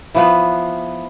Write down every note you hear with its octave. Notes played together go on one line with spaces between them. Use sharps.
E3 F3 B3